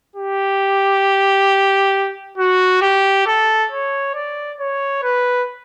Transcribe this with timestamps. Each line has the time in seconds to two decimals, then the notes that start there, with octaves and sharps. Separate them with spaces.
0.16 G4
2.38 F#4
2.82 G4
3.27 A4
3.71 C#5
4.15 D5
4.60 C#5
5.03 B4